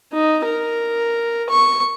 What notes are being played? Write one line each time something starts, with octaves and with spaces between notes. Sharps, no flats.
D#4
A#4
C#6